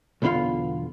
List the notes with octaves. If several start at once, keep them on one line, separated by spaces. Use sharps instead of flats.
B1 E2 D3 B3 F4 F5